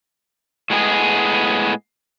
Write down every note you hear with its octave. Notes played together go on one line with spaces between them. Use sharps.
A2 G#3 B3 E4 G#4